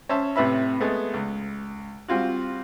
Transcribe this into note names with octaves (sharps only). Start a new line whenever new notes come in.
C#4 C5 E5 A5
A2 C3 B4 E5 B5
G#3 A3 B3
C#2
G3 C4 F4 F#4